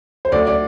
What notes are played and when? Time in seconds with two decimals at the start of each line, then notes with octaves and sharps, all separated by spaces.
0.25 C5
0.32 D2 D5
0.47 D5